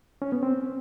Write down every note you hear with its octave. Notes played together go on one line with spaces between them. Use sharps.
C#4
B3
C4